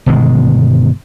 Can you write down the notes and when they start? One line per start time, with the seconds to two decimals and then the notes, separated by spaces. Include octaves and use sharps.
0.06 G1 B2 D#3 G#3